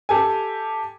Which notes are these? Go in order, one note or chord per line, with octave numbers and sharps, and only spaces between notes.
G4 A4 G#5